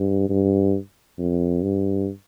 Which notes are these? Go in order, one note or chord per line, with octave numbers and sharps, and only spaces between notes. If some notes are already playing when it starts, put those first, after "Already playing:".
Already playing: G2
G2
F2
G2